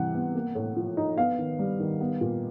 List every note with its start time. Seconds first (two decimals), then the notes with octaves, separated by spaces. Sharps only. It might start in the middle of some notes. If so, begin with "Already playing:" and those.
Already playing: C3 E3 G3 F#5
0.14 B3
0.35 A#3
0.55 A2
0.76 F3
0.97 D#4
1.17 B3 F5
1.38 D#3
1.59 G3
1.80 D#3
2.00 B3
2.21 A#2